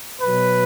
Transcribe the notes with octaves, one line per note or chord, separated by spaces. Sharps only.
B2 F#3 B4